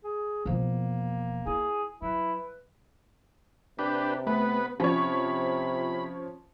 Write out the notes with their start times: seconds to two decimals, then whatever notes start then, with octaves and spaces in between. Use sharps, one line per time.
0.04 G#4
0.46 E1 F3 A#3
1.46 E4 G#4
2.02 F#3 E4 B4
3.79 C3 D4 G4 B4
4.27 A3 B3 B4
4.80 C3 F3 C#4 C#5 B5